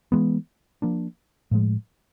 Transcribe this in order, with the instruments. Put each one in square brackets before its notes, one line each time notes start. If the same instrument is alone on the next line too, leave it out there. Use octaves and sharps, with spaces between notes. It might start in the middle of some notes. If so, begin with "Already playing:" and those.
[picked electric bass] E3 G#3 B3
F3 A#3 D4
A2 F3 G#3